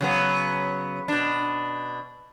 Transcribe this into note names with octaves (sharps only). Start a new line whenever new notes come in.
C#3 F#3 B3
B2 D4